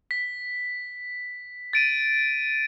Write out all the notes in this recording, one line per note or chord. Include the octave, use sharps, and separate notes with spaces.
B6
A6 D7 D#7